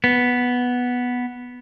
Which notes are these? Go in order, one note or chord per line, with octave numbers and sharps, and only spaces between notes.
B3